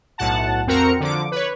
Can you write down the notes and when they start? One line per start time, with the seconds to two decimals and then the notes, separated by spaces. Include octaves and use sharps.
0.18 B1 A2 F#5 A5
0.67 F2 C4 F#4 A#4 A#5 C#7
1.00 D3 F3 D6
1.31 B4 C#5